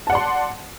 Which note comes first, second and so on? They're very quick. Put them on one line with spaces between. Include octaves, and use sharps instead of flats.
A5 F#5 D5 C6